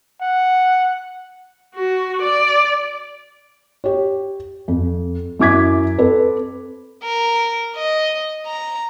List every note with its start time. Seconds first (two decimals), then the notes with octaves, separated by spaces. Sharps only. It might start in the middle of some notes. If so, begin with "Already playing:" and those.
0.21 F#5
1.75 F#4
2.22 D5
3.84 G4 C#5
4.68 F2
5.39 F#2 E4 D6 G#6 B6
5.98 C4 A4 B4
7.03 A#4
7.76 D#5
8.47 A#5